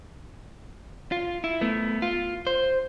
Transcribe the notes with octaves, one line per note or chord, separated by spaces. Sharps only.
F4
E4
A3 B3
F4
C5